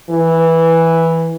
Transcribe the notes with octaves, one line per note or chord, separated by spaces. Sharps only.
E3